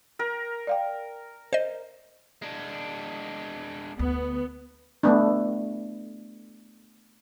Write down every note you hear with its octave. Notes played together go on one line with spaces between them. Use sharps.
A#4
D5 F5 G5
C5 D5 D#5
G#3 D4
D2 B3
A3 B3 D4